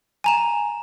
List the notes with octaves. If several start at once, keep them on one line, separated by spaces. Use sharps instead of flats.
G#5 A#5 E7